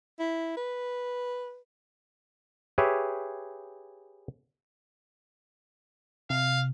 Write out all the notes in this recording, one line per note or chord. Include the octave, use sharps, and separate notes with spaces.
E4
B4
G4 G#4 B4 C#5 E5
C3 F5